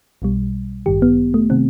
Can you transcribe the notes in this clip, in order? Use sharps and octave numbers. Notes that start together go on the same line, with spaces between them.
B1 B2 G3
A1 G2 D#3 G4
B3
A3
C3 D#3 C4